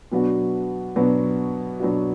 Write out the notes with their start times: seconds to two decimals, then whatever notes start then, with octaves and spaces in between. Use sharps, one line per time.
0.12 B2 F#3 B3 D4 F#4
0.96 B2 F#3 B3 D4 F#4
1.80 B2 F#3 B3 D4 F#4